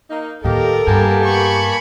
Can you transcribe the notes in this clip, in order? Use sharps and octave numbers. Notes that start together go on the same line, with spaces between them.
A#3 D#4
D#2 A2 G4 A4 A#4 D#5 F5
G2 A#3 B3 G4 G#5 A5
B5 C#6